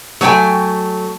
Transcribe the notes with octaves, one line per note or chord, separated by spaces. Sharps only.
F#3 A3 C#5 G5 G#5